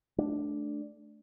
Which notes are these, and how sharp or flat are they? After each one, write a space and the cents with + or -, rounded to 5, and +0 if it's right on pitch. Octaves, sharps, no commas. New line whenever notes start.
A3 -20 D4 +0